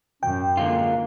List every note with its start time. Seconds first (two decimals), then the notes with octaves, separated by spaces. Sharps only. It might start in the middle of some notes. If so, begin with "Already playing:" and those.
0.23 F#2 C#4 G5
0.57 D3 G#3 A#3 F4